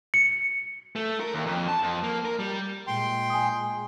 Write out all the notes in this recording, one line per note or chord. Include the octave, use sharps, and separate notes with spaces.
C#7
A3
A#4
D#2
F2
A5
F2
A#3
A#4
G3
A#2 G#3 G5 C6
G#5 D#6